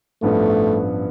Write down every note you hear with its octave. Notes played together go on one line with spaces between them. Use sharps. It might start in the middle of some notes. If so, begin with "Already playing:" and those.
A1 G2 F3 A3 B3